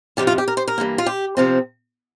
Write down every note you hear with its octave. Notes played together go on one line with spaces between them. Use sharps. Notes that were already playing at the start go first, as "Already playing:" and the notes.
F2 C3 F3 G4
F4
G4
A#4
C5
A#4
G2 E3 A#3
F4
G4
C3 F3 C4